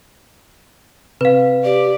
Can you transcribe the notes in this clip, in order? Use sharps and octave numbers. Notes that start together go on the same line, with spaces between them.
C3 B4 F5
G4 D5